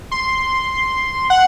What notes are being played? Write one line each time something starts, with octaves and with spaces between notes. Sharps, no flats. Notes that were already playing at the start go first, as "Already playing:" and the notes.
C6
F#5